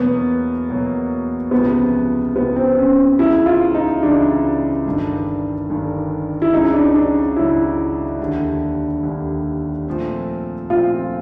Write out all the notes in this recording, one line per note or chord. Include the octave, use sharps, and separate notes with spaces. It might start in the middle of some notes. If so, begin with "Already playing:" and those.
Already playing: E2 B2 F#3 A#3 B3
E2 B2 F#3 A#3
C#2 C3 F3 B3
C#2 C3 F3 B3
C4
C#4
C#2 C#3 E3 E4
F4
D#4
C#2 C#3 E3 D4
G1 G2 D#3
G1 G2 D#3
E4
C#2 C#3 F#3 D#4
D4
D4
C#2 C#3 F#3 E4
D#2 D3 G3
D#2 D3 G3
A#2 F3 A3 C4
A#2 F3 A3 C4 F4